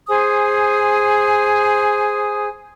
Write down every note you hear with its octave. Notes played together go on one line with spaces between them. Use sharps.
G#4 C5 G#5 D#6